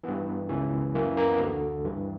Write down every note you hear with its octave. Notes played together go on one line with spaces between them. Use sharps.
G2 E3 B3
C#2 C#3 E3
F#2 E3 A#3
A#3
B3
D2 D3
G2 E3